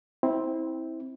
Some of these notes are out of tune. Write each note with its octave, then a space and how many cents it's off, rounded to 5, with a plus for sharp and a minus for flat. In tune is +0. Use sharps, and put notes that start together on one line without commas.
C4 +0 E4 -25